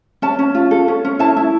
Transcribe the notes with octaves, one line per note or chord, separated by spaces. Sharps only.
C#4 A5
C#4
F4
A4
C#4
C#4
E4 A5
E4